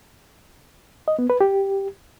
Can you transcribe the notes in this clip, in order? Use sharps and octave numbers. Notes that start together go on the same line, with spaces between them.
D#5
B3
B4
G4